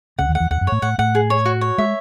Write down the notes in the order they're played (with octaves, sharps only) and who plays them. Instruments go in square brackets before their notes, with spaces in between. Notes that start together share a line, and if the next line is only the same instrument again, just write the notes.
[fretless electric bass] C#2 C#3 [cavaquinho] F#5
[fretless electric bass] D#2 D#3
[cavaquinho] F#5
[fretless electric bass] E2 E3
[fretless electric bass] D#2 D#3 [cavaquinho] F#5
[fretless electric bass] F#2 F#3
[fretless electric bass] A2 A3 [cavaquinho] C#5
[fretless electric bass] A2 A3 [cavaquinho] F#5
[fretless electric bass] A2 A3 [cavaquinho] F#5
[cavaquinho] G#4
C#5
F#4
C#5
[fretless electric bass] G#3 [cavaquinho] E5